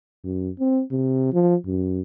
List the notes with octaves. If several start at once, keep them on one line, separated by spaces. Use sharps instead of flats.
F#2
C4
C3
F3
F#2